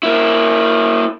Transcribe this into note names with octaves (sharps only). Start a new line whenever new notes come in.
A#3 E4